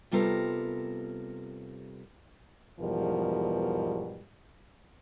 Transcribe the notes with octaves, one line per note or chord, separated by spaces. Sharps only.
C3 G3 B3 F4 A4 A#4
E2 G#2 B2 F3 G3 A#4